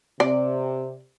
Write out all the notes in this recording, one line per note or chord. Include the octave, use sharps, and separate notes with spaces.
C3 D5